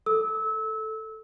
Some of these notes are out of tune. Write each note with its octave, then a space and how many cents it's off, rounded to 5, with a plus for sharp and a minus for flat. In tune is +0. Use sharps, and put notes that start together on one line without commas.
A4 +0 E6 -25